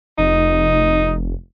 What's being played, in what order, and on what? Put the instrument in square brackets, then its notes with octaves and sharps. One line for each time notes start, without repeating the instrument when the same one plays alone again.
[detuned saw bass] F1 [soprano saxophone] D#4